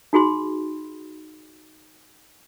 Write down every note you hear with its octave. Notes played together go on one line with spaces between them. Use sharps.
D#4 F#4 G#4 B5 C6